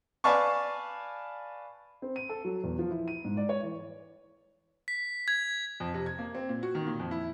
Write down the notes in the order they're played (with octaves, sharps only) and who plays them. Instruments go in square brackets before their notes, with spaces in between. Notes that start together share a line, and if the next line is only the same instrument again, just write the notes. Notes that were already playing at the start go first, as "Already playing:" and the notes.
[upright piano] B4 D5 F5 G#5 A5 C#6
[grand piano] C4
D#7
A4
F#3
E2
F3
E4
D#7
G#2
D5
C#5
E3
[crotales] B6
G#6
[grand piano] F2
C3
G#6
A#3
C4
A#2
F#4
D#3
A#2
F2
E4